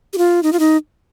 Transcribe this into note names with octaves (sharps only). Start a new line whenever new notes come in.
G4
F4
D#4
F4
D#4